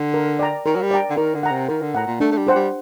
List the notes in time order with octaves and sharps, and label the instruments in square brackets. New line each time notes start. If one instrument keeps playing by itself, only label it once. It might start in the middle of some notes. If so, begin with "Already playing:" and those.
Already playing: [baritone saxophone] D3
[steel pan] A#4
D5 G5 A#5
[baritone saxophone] D#3 [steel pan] A#4
[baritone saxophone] F#3
G3
[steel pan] D5 G5 A#5
[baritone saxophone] D3
[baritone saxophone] D#3 [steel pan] A#4
[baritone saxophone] D3
[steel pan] F#5 A#5
[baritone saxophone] C3
[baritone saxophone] D#3 [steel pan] A#4
[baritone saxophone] D3
[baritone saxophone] A2 [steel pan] F#5 A#5
[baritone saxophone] A#2
[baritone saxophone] A3 [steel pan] D4
[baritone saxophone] A3
G3
[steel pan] G4 C5 F#5
[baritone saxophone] G3